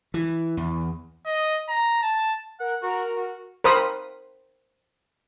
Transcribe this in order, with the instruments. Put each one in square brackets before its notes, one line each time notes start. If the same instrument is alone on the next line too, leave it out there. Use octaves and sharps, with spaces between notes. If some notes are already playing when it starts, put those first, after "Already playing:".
[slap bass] E3
E2
[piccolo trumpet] D#5
A#5
A5
[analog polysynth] A#4 [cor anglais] F#5
[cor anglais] F#4 [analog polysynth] A#4
[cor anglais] F#4
[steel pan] A#4 C5 B5 D#6